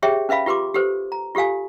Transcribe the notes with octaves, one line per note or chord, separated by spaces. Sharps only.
G4 G#4 C#5 E5 G5
C#4 B4 E5 F5 B5
F4 G4 B4 C6 D6
G4 A4 B4 C5
A#5
F4 G4 A4 F5 G#5